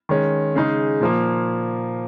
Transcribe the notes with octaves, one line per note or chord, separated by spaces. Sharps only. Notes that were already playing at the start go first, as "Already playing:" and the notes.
D#3 G#3 C#4
C#3 G#3 D#4
A#2 F3 A#3